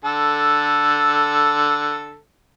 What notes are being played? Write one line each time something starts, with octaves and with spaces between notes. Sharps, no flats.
D3 A4